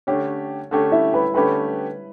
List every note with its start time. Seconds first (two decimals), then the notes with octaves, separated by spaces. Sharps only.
0.07 D3 A3 C#4 G4 C#5
0.71 D3 A3 C#4 G4
0.92 E4 E5
1.13 B4 B5
1.34 D3 A3 C#4 G4 B4 B5